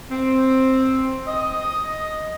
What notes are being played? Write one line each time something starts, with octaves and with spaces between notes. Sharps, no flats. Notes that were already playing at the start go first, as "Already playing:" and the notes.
C4
D#5